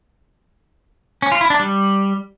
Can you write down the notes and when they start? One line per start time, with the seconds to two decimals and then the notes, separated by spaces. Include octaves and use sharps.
1.22 C#4
1.32 F4
1.41 E4
1.50 D4
1.59 G3